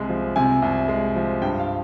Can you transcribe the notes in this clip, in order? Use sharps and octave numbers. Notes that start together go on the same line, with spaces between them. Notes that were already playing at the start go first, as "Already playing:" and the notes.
Already playing: C2 C3 G#3
F3
C3 G#5
C2
G#3
F3
G2 G5
F5